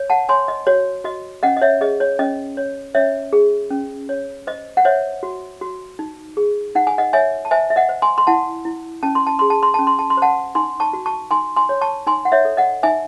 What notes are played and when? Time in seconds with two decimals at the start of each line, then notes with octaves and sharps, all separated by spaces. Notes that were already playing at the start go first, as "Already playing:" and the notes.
Already playing: C#5
0.10 F#5 A5
0.29 C#5 G#5 C6
0.48 D#5
0.67 F#4 C#5
1.04 F#4 D#5
1.43 C#4 D#5 F#5
1.57 D#5
1.62 C#5 E5
1.81 G#4 D#5
2.00 C#5
2.19 C#4 D#5
2.57 C#5
2.95 C#4 C#5 E5
3.33 G#4
3.70 C#4
4.09 C#5
4.47 C5 D#5
4.77 F#5
4.85 C5 C#5 E5
5.23 F#4
5.61 F#4
5.99 D#4
6.37 G#4
6.75 D#4 F#5
6.87 G#5
6.98 D#5 F#5
7.13 C#5 E5 G#5
7.45 A5
7.51 C5 E5 G#5
7.70 E5
7.76 D#5 F#5
7.89 C5
8.02 G#5 C6
8.18 C6
8.27 E4 F#5 A5
8.65 E4
9.03 C#4 A5
9.15 C6
9.27 A5
9.39 G#4 C6
9.50 A5
9.63 C6
9.74 C#4 A5
9.87 C6
9.99 A5
10.10 C6
10.17 C5 F#5 A5
10.55 D#4 G#5 C6
10.80 A5 C#6
10.93 F#4
11.06 A5 C#6
11.31 D#4 G#5 C6
11.56 G#5 C6
11.69 C#5
11.81 A5 C#6
12.07 D#4 G#5 C6
12.25 F#5
12.32 C#5 E5
12.45 A4
12.57 D#5 F#5
12.83 D#4 E5 G#5